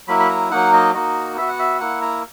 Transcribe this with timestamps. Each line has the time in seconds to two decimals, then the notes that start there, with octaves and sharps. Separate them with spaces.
0.08 F#3 A#3 E4 B5
0.20 B5
0.30 A#5
0.51 F#3 A#3 D#4 F#5
0.73 D#5
0.94 A#3 D#4 F#4 D#5
1.37 B3 F#4 E5
1.48 F#5
1.59 E5
1.80 A#3 E4 F#5
2.02 A#5